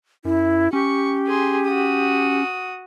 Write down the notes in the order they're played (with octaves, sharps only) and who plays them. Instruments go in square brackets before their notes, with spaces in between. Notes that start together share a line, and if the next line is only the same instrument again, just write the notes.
[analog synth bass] F#2 [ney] E4
[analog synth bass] C#4 [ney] G4 [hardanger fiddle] C#6
[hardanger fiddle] G#4 C6
F#4 D#6